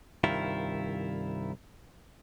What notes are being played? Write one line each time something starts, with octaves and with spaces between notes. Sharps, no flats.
C2 G2 D#3 E4 F4